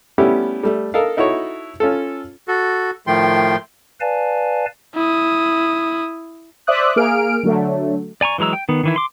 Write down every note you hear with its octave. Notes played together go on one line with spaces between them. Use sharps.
G3 A3 B3 C#4 E4 G4
G3 A3
A4 A#4 D#5 F5
D#4 E4 F#4 A4 C#5
C#4 F4 A4
F#4 A4
A2 D#3 F3 A3 G5 C6
B4 D5 F5 G#5 A5
E4 D#6
C5 D5 E5 D6 D#6 F#6
A#3 G#4 F6 D7
D3 F#3 A3
D5 G#5 A#5 C#6
E3 F#3 G#3 A#5 E6
G5
D#3 B3
D#3 E3 E4
C6 D6